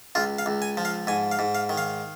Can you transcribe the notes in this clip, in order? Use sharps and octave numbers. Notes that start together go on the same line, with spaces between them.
C#2 F4
F5
C#2
G#5
F3
F5
G#2 G#5
F5
G#2
F5
D#3
F5